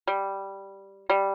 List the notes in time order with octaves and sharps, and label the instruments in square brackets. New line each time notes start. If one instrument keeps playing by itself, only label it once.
[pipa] G3
G3